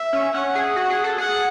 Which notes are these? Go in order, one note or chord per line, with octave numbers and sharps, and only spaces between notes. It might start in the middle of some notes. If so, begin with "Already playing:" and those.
Already playing: E5
C#4
C#4 F#5
G#4
F#4
G#4
A4
G#4 F#5